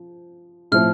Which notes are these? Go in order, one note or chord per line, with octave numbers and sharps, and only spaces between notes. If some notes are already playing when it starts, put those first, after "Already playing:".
Already playing: F3
A2 F3 C4 F6